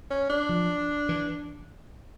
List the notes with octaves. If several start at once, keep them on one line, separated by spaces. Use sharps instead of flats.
C#4
D4
F3
E3